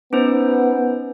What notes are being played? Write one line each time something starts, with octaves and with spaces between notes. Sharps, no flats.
B3 C#4 D#4 C5